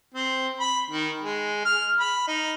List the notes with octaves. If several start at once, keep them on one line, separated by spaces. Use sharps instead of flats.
C4
B5
D#3
G#3
F6
B5
D#4